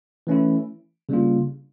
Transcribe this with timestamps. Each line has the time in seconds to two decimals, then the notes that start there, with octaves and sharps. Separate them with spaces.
0.27 E3 A3 C#4 E4
1.09 C#3 G3 A#3 D4 F4